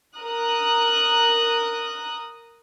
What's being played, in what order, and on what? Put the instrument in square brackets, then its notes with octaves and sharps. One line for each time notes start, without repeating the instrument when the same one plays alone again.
[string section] A#4 D#6 F#6